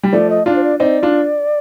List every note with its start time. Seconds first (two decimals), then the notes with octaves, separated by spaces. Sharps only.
0.03 G3
0.13 F3 A3 D5
0.30 D#5
0.46 D4 F4 D5
0.56 C5
0.64 D5
0.80 C4 D#4 D5
1.03 D4 F4